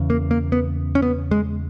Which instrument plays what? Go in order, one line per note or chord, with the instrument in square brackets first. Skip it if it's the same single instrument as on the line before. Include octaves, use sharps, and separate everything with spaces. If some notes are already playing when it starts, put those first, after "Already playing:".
Already playing: [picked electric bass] E2 C#3
A#3
A#3
B3
C#4
B3
G#3